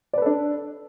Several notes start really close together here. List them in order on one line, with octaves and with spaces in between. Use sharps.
D5 B4 A4 D4